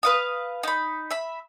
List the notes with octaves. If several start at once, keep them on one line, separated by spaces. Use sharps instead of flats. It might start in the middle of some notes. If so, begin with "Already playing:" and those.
B4 F5 D#6
D#4 B5
E5 B5